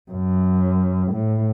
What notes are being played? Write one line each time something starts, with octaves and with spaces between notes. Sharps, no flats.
F#2
A2